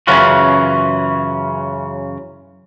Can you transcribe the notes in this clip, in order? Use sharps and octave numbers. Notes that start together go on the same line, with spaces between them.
F#2 C#3 E3 C#4 F4 F#4